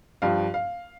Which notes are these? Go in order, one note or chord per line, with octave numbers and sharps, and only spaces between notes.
G2 F3 F5
F5